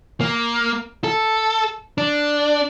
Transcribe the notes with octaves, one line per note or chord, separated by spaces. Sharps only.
A#3
A4
D4